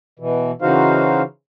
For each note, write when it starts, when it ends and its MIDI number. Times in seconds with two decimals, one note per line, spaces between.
0.19 0.51 47
0.19 0.51 52
0.62 1.22 49
0.62 1.22 52
0.62 1.22 63
0.62 1.22 66
0.62 1.22 72
0.62 1.22 77